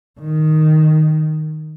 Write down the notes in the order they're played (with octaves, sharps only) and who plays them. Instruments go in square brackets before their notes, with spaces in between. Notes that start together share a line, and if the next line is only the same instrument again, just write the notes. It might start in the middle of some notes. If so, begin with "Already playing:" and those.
[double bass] D#3